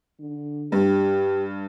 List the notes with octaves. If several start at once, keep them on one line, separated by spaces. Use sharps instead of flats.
D3
G2 G4